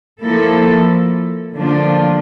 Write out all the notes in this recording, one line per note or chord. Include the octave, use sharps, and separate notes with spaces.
F3 A#3 E4 A4
D3 F3 A#3 D4 F4